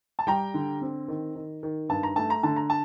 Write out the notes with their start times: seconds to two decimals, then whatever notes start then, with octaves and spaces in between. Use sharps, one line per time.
0.19 A5
0.27 G3 G5 A#5
0.54 D3
0.81 C4
1.08 D#3
1.36 D#3
1.63 D#3
1.89 G2 A5
2.03 A#5
2.16 A3 A5
2.30 A#5
2.43 D3 A5
2.56 A#5
2.70 A5